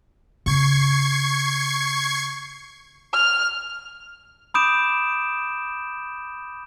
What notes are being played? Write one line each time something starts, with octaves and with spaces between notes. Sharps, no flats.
C#3 C#6 G#6 C7
F6
B5 D6 D#6 G6 D7 E7